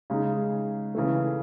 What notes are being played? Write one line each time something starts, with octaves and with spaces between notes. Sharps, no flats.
C#3 G#3 D#4
C#3 E3 A3